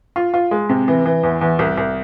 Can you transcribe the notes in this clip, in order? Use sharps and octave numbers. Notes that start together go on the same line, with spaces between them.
F4
F4
G#3
C3
E3
E3
E2
E2
C2
C2